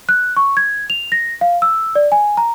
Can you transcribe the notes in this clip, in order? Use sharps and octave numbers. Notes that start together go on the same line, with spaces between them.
F#6
C#6
G#6
F7
A#6
F5
E6
D5
G#5
A#5